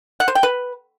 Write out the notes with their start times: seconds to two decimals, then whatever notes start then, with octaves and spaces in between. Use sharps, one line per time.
0.20 F#5
0.28 C5
0.35 G5
0.43 B4